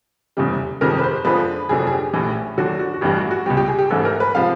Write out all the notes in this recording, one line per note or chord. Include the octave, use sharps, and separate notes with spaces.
F1 E2 C#3 E3 G3
G1 F2 C3 D#3 G#3 A#4
B4
C5
F2 D3 F3 G#3 B4
F1 F2 D3 F#3 G#4
G#4
G4
A#1 A2 E3
D#2 D3 F#3 F#4
F#4
F#4
A1 G2 E3 G3 G4
F#4
F#4
C#2 B2 G3 G4
G4
G#4
G4
A1 G#2 E3 A4
A#4
B4
C3 F3 G#3 F5